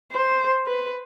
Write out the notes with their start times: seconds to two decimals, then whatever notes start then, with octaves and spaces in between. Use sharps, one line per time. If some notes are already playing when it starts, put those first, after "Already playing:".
0.12 C5
0.67 B4